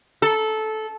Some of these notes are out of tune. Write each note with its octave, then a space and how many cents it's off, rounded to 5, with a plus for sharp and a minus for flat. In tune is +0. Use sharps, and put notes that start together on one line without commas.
A4 -15